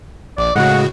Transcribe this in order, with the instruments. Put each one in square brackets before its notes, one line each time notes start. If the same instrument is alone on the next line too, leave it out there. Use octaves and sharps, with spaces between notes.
[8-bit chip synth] A#1 [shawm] D5
[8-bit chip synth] A2 C#3 F#4 [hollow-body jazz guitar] G#3 [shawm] F#5